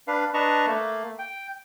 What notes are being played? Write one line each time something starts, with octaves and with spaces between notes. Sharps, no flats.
D4 B4 F5
D4 B4 D#5 A5 A#5 C#6
A3 A#3
G5